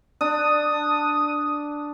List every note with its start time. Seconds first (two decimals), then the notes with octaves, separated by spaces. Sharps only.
0.21 D4 D#6